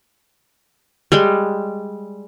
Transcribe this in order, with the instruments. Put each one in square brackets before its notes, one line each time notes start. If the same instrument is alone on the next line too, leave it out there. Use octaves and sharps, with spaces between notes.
[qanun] G3 G#3